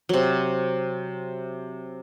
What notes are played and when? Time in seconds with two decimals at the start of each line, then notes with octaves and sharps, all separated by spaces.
0.09 C3 F#3